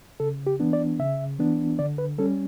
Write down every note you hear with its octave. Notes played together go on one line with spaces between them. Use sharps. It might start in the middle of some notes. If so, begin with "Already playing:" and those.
C#3 A4
G4
E3 B3 D4
D5
C#3 E5
E3 B3 D4
D3 D5
B4
G3 C#4 A4